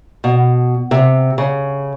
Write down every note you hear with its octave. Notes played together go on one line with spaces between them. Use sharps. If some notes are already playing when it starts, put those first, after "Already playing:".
B2
C3
C#3